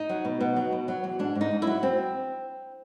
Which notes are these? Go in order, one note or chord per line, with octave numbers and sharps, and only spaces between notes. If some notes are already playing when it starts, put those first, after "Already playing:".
Already playing: D#4
F#3
B2
B2
F#3
B2
F#3
E2
G#2 D4
G#2
D#4
G#2
E4
F#3
C4